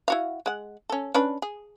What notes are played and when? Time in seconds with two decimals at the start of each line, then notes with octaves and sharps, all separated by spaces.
0.08 E4 F#4 F5
0.46 G#3 F#5
0.90 C#4 A4
1.14 C#4 D4 B4
1.42 G#4